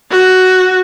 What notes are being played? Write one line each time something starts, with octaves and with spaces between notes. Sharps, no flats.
F#4